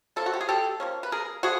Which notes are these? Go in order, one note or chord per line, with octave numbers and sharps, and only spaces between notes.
C#3 F3 A#3 A4
F#4
G4
G#4
G4 A4
F3 A#3 C#4
B4
G#4 A#4
D3 F3 F#4 G#4